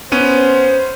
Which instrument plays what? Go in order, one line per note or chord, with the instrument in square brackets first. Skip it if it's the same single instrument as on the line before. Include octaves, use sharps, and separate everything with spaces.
[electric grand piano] B3 C#4 D#7 [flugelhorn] C5